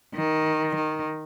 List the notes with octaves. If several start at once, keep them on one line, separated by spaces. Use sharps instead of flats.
D#3
D#3